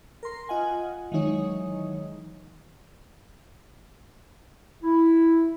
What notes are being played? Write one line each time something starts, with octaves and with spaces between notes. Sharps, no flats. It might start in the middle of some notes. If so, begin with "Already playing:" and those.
A#4 C6
F4 D#5 F#5 G#5
D#3 E3 F#3 G#3 D#4 C#5
E4